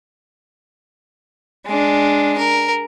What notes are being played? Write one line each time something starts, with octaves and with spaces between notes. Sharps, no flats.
G#3 D4
A#4